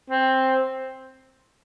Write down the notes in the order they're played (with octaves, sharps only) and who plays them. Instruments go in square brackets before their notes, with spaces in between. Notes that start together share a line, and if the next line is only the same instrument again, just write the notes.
[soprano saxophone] C4